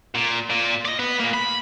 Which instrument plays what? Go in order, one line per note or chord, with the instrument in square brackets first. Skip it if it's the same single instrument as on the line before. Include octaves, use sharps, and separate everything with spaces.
[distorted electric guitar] A#2
A#2
D5 D#5
B3
A#2 A#3
B5